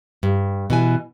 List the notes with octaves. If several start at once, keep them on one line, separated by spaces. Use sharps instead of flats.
G2
B2 E3 G#5